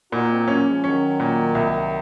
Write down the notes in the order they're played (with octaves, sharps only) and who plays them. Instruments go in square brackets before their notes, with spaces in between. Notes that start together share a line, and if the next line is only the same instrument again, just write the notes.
[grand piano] A#2 [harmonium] D#4 F#4
[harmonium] C4 D#4
[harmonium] F#3 A#3 [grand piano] C#4
[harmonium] F3 G#3
[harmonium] D#3 F#3 [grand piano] C#4
[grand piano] A#2
C2